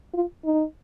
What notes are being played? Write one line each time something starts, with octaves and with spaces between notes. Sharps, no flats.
F4
D#4